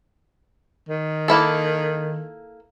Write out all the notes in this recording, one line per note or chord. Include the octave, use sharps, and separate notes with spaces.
D#3
A#3 E4 A4